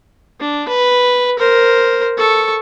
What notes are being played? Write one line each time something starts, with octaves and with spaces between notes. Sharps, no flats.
D4
B4
A#4 C5
A4 C#6